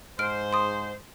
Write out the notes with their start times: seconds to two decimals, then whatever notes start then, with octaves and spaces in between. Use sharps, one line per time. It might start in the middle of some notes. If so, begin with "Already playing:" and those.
0.19 G#2 C5 F6 D7
0.53 C6 D#6